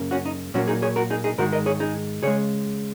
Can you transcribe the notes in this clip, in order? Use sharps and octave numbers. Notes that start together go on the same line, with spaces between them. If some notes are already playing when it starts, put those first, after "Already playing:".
Already playing: F#2 C#3 A#3
C#4 F#4
D#4
A#2 F#3 A#3 C#4 F#4
D#4 G#4
G#4 C#5
F#4 A#4
D#4 G#4
D#4 G#4
G#2 D#3 G#3 F#4 A#4
A#4 D#5
G#4 C#5
D#4 G#4
C#3 G#3 G#4 C#5